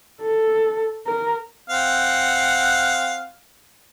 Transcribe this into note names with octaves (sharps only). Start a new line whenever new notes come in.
A4
A#4
C4 F5 F#5